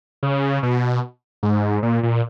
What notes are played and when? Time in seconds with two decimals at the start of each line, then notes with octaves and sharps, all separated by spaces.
0.23 C#3
0.63 B2
1.43 G#2
1.83 A#2
2.03 A#2